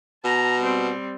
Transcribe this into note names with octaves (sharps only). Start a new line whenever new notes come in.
B2 A5 A#5
G3 C4